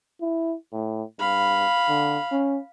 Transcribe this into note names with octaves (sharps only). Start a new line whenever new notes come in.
E4
A2
G2 F5 B5
D3
C#4